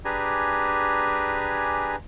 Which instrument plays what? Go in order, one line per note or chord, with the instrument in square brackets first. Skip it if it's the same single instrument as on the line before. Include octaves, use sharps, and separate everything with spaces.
[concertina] D4 G4 G#4 B4 G#5 A#5